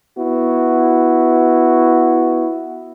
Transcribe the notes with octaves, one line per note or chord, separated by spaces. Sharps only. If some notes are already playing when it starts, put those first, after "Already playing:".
B3 E4 F#4